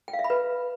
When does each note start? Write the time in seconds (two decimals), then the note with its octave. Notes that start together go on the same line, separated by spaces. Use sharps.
0.08 G5
0.13 F5
0.19 E5
0.24 B5
0.30 B4